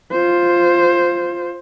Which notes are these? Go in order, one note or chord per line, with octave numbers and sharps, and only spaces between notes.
F4 C5